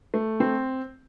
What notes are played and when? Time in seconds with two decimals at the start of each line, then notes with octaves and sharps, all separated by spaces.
0.14 A3
0.40 C4